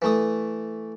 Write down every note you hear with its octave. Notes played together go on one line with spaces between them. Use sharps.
E3 A3 D#6